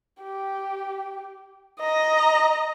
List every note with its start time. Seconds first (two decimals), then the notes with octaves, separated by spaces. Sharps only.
0.23 G4
1.80 D#5 A#5